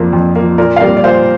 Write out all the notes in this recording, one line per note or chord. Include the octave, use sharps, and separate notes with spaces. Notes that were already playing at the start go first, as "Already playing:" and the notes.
Already playing: F2 F3 A#3 D5
F2
F3 A#3
A#2 A#4 D5
F5
G3 A#3 A#4 D5
D5
A#2 C5 F5